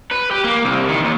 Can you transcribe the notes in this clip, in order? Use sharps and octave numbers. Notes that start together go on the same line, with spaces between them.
B4
G4
A#3
C2
D#3
D#2